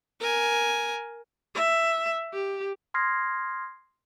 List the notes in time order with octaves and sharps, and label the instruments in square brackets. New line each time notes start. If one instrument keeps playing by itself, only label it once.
[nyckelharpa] A#4 G#5
[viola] E5
G4
[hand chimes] C6 D#6 F6 G#6 A#6 C7